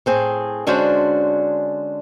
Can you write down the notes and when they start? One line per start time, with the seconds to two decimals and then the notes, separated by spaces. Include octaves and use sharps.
0.06 A2 C4 G#4
0.67 D3 G#3 C#4 D4 F#4 C5